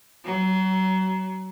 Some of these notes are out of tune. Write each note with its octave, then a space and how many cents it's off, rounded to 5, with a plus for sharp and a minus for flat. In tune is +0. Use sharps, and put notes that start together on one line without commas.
F#3 +30